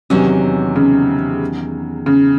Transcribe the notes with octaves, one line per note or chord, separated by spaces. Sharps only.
E2 C3 D#3 F#3 C#4
C#3
C#3